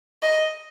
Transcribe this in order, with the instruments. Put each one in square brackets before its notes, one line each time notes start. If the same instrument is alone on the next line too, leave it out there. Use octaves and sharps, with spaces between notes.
[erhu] D#5